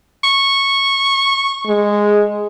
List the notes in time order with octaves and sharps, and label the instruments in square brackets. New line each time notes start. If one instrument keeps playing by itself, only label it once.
[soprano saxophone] C#6
[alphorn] G#3